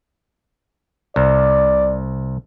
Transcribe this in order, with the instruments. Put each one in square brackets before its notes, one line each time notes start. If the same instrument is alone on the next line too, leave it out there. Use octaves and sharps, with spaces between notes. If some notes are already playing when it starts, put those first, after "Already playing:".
[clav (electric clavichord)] C2 [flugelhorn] D5